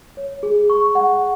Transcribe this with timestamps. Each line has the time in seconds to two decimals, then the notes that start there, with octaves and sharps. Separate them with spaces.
0.17 C#5
0.43 G#4
0.70 C#6
0.95 F#5